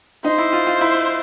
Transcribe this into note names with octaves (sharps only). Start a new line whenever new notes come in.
D#4 C5
E4
F4
F4
E4